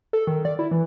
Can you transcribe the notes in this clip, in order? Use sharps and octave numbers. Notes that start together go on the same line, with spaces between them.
A4
D#3
D5
E4
E3